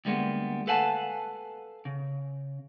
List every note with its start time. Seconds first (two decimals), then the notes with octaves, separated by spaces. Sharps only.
0.05 D2 G3 G#3 A#3 B3
0.67 A4 B4 F5 F#5 G#5 A5
1.85 C#3